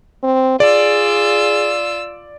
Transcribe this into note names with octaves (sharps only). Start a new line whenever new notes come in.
C4
F4 G#4 D5 E6